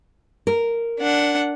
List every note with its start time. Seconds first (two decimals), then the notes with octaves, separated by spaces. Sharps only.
0.47 A#4
1.00 D4 F#5